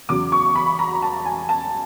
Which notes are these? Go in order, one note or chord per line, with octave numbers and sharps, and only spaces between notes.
E2 C#3 F#3 D6
C#6
B5
A#5
A5
G#5
A5